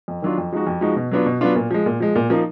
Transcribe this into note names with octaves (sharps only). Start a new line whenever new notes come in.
F2
D#3 F#3 D4 F4
F2
F3 G#3 D#4 F#4
F2
F3 G#3 D#4 F#4
B2
F#3 B3 D4 F4
B2
F#3 B3 D4 F4
A#2
F3 G#3
A#2
F3 G#3
A#2
F3 A#3 D#4